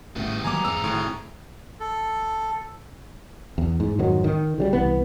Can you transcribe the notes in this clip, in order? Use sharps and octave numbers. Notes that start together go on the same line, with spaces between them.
G#1 A2 C#3 G3 A3 B3
D#3 F#3 A#3 G#5 A#5 D6
E2 G#2 C4 G#4 E6
F#1 A2 D#3
A4
E2
G#2
F2 G#2 D#3 F#3
D#3
C#3 F#3 G3
C2 E3 B3